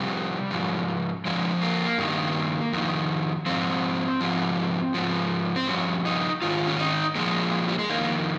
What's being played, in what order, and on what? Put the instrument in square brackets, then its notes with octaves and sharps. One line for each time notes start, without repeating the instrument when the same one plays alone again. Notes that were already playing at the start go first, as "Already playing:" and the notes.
Already playing: [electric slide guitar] F2 C3 G3
G#2 F3
F2 C#3 F3 G#3
A#3
G2 D#3
F2 D#3
G#2 F3 C4
G#2 F3
G#2 F3
C4
G2 F3 C#4
D#4
G#2 D#3 F4
C#4
D#4
A#2 F3 G#3
G3
G#3
F2 D#3 A#3